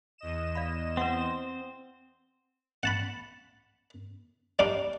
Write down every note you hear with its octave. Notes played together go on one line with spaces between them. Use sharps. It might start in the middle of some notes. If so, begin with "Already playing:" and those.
E2 D#5 E7
D5 F5 B5
C4 B4 C5 E5 F#5
F#5 A5 B5
G3 D4 D#4 F5 D6